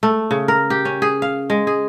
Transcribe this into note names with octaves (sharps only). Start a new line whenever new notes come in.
A3
C#3
A#4
G4
C#4
G#4
F5
G#3
G#4